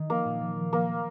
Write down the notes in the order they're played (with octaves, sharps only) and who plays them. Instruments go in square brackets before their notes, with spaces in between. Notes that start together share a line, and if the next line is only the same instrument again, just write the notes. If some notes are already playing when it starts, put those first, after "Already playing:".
Already playing: [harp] D#3
[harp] F3 [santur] A#3
[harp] A#2
F3
F3
[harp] F3 [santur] A#3
[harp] A3